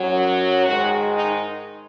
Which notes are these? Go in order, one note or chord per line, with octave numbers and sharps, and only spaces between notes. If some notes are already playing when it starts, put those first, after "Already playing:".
Already playing: F#2 F#3
G#2 D#3 G#3 F#4
D#4